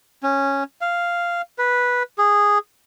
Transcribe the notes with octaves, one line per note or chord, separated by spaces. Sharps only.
C#4
F5
B4
G#4